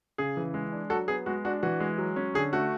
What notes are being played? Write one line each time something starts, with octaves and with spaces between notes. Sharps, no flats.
C#3 G#4
E3
G#3
D4
F#3 F#4 A4
B3 G#4
G#3 F#4
D4 F#4
E3 F#4
G#3
F#3
C#4
D3 G#4
A3 F#4